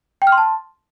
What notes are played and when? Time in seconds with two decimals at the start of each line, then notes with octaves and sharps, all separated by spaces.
0.22 G5
0.27 F6
0.32 C6
0.38 A5